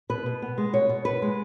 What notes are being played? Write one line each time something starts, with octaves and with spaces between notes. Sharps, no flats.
B2 B4
B2
B3
G#3
B2 C#5
B2
B3 B4
G#3